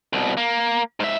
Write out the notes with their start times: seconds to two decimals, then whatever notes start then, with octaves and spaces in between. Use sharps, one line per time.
0.13 C2 B2
0.37 A#3
1.00 G#2 E5